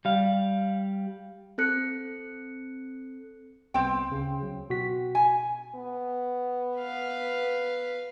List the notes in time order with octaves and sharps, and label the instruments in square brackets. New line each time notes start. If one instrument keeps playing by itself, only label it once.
[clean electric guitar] G3 F5
[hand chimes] C4 A4 F#6 C#7
[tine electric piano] C2 B3 [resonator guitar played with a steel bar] C4 G5
[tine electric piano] D2 C#3
F#3
B2 F#4 B6
[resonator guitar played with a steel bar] G#5
[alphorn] B3
[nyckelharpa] B4 F5